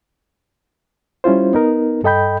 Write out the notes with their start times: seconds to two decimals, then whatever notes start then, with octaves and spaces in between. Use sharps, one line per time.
1.24 G3 C#4 E4 F4 C5
1.53 B3 D#4 A#4
2.04 G2 A4 D#5 G5 B5 G6